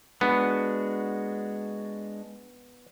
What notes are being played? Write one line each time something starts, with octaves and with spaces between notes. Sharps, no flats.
G#3 B3 D4 F#4